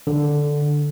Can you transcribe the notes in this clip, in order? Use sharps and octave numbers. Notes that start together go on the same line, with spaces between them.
D3